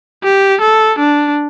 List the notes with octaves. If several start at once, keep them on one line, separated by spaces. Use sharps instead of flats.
G4
A4
D4